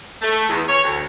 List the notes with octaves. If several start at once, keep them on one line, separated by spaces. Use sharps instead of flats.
A3
E2
C#5
D2